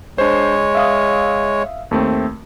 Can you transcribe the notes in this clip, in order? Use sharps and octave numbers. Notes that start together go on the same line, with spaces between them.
G#3 D4 C5 C#5
E5 F5 D#6
D#2 A3 C4